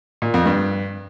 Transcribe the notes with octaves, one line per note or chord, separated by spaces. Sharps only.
A#2
F2
G2